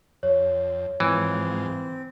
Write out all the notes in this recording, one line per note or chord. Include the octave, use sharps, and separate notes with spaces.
F2 C#5
G#2 E3 F3 C4